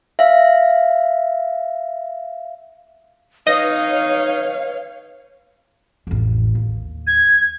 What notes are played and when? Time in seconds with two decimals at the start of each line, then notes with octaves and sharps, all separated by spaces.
0.19 E5 F5
3.47 D#4 B4 C#5 D#5 F5
6.07 A1 F2
6.55 D#2
7.07 G#6